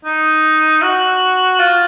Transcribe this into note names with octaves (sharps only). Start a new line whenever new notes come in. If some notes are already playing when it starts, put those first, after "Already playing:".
D#4
F#4
F4